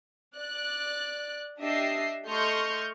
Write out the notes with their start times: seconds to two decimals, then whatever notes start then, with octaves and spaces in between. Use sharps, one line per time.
0.35 D5 F#6
1.59 D4 G4 D#5 E5 C7
2.26 A3 D#5 C6 C#6 F6 G6